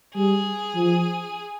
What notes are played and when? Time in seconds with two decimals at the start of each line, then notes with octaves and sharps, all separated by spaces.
0.15 G3 G#4
0.75 F3